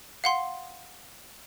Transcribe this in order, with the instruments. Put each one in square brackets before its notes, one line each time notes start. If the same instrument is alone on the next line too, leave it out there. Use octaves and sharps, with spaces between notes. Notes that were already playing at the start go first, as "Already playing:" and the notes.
[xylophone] F5 F#5 C6